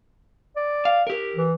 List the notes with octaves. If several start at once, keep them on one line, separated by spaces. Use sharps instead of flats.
D5
F5
G4 A#4
E3